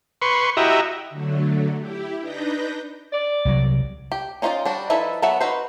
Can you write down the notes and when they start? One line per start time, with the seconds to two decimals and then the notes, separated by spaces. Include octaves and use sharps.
0.22 B4 C6 C#6
0.57 E4 F#4 G4 D#5 E5 A#5
1.10 D3 F#3 A3
1.78 E4 G4
2.21 D4 D#4 B4 G6 A#6
3.13 D5
3.45 C2 F#3
4.12 G4
4.42 C#4 D#4 F4 C5 D5
4.66 G3 D4 F#4
4.90 F3 D#4 E4 A4 B4
5.22 F#3 B3 A4 E5 F#5
5.41 D#4 F#4 B4 C5